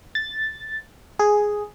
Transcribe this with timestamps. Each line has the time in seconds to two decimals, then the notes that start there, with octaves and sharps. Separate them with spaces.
0.15 A6
1.19 G#4